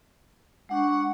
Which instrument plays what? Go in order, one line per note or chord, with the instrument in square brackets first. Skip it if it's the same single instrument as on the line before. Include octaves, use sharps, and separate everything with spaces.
[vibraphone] G#3 D4 C#6 [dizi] F#5